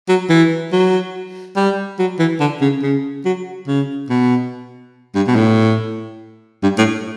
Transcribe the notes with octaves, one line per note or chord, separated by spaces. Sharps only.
F#3
E3
F#3
G3
F#3
E3
D3
C#3
C#3
F#3
C#3
B2
G2
B2
A2
G2
A2